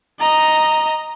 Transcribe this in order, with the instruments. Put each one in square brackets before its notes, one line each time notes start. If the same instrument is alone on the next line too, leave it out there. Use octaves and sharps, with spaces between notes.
[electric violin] D#5 A#5